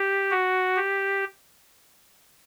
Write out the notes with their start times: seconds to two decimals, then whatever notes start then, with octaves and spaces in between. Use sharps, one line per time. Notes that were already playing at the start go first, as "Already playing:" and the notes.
Already playing: G4
0.31 F#4
0.76 G4